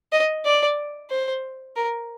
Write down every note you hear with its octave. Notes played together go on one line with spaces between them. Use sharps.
D#5
D5
C5
A#4